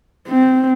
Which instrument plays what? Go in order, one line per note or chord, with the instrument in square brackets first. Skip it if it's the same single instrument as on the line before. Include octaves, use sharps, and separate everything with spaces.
[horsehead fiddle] C4